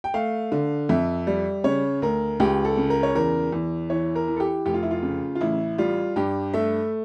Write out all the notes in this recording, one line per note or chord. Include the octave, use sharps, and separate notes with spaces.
G5
A3 F5
D3
F2 E5
G3
C#3 C#5
D2 A#4
C#2 G4
A4
C#3
A#4
C#5
E2 A#4
E2
E3 C#5
A#4
E3
A4
G4
F1 G4
F4
E4
F4
C#3
F4
A1 E4
G3 F4
G2 G4
A3 E5